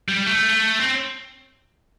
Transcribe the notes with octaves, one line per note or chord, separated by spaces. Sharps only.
G3
A3
C4